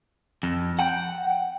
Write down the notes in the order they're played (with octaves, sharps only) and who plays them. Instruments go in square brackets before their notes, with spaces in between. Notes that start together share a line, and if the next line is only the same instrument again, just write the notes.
[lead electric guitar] F2
[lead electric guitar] F#5 [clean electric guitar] G5